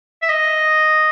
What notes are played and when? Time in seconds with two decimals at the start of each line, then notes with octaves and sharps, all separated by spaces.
0.22 E5
0.29 D#5